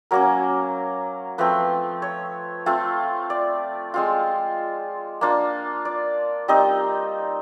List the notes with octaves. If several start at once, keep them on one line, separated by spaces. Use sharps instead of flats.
F#3 A#3 C#4 A#4
F3 A3 C4 B4
C#5
A3 C4 F4
D5
G#3 C4 F4
A#3 D4 F4
D5
G3 C4 D#4 D#5